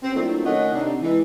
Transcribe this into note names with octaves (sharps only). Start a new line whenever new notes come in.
C4
A#2 F#3 A3 C4 D4 E4
D#3 A3 C#4 D#5 F#5
C3 D4 D#4
E3 G#3